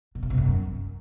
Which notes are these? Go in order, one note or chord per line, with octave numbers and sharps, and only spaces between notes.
B2
C3
B2
F#2